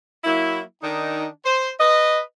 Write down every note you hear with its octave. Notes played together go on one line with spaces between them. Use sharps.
F#3 A#3 E4
D#3 D4 D#4
C5
B4 D#5